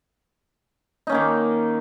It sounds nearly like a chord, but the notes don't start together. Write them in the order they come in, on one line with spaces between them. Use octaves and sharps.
D#4 C#4 A#3 D#3